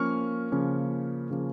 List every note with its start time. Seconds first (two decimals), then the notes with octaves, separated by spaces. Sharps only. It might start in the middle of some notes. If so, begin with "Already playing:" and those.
Already playing: F3 A#3 C#4 C#6 F6
0.52 C#3 F3 A#3 C#4
1.30 C#3 F3 A#3 C#4